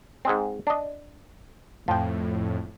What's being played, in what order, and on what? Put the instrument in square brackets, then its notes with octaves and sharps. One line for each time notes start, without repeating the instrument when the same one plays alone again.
[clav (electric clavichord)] G#2 G#3 C4
D4 D#5
[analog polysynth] F2 A2 [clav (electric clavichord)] F3 G5